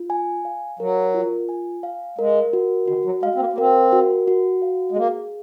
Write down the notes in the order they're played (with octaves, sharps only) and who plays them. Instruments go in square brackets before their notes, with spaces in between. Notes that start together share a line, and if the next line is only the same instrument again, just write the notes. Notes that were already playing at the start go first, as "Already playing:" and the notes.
Already playing: [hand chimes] F4
G#5
F5
[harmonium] F#3 [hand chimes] A#4
[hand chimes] F4
G#5
F5
[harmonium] G#3 [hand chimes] A#4
[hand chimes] F#4
[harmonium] D#3 [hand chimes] F#4
[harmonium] F#3
[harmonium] G#3 [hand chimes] F5
[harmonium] C4
A#3
A#3
[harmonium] C4 [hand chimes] A#4
[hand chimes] F#4
F#4
F5
[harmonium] G#3
[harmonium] A#3 [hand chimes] G#4